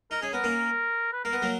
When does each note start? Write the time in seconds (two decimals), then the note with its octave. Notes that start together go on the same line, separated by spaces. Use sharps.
0.11 D#4 A#4
0.22 C#4 G#4
0.33 B3 A#4
0.44 A#3 C#4
1.13 B4
1.24 A#3 A#4
1.33 B3
1.42 F#3 A#3